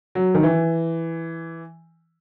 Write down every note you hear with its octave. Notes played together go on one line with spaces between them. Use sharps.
F#3
D#3
E3